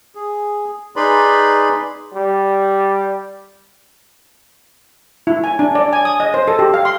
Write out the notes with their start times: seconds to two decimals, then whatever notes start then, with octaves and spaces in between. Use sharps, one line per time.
0.15 G#4
0.96 D#4 G#4 B4 D5 B5 C6
2.14 G3
5.27 E4
5.44 G#5
5.59 D4
5.75 D5
5.93 G#5
6.05 D#6
6.20 D#5
6.34 C5
6.48 A4
6.59 G4
6.74 F5
6.85 C6